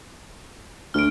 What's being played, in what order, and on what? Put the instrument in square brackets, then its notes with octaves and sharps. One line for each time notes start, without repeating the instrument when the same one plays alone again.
[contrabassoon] D2 [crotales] F6 D7